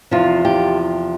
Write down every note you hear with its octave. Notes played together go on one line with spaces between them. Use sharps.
E2 C3 F3 F4
G4